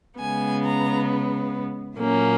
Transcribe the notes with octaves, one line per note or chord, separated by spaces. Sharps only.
C#3 G#3 B3 G#5
A#5
A#2 F#3 A#3 C#4